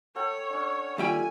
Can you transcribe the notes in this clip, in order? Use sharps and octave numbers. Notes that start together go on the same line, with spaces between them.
A4 C#5 F#5 G5
C#4 D4
D#2 G3 A3 F4 G5 G#5